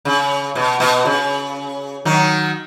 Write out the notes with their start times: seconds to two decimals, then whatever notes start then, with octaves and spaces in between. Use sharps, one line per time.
0.05 C#3
0.55 B2
0.80 B2
1.05 C#3
2.05 D#3 F#3